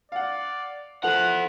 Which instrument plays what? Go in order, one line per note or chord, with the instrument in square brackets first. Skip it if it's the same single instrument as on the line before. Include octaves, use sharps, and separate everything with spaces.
[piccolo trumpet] D5 [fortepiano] F5 F#5
[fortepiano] F3 [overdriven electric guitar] E4 F#5 [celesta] A4 F7 F#7 [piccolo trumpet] F#6